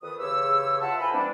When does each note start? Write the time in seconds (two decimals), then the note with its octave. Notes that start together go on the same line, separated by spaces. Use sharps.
0.02 F2 D#3 A4 B4 D#6
0.20 E2 C#3 G4 C#5 E6
0.81 F4 E5 F#5 A5
1.00 E4 A4 A#4 C5 G#5 B5
1.13 E3 G3 A#3 C4 D4